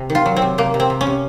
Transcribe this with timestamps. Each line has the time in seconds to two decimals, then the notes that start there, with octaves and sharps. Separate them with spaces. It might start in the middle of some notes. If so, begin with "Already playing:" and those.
Already playing: C3
0.10 D#3
0.15 F4
0.26 F#3
0.36 C4
0.42 C3
0.58 C3 A#3
0.74 C3
0.80 C4
0.90 C3
1.01 C#4
1.07 C3